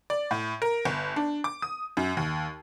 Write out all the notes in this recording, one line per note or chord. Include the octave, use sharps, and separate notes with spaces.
D5
A2
A#4
G1
D4
D6
D#6
F#2
D#2